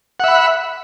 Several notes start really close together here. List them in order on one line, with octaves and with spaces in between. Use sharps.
F#5 E5 B5